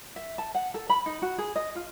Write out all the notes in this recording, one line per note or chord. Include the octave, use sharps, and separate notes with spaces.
E5
A5
F#5
A4
B5
D#4
F#4
G#4
D#5
F4